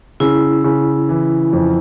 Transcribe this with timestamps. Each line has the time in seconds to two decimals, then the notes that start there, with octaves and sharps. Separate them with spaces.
0.20 C#3 E4
0.64 C#3
1.09 E3
1.53 F2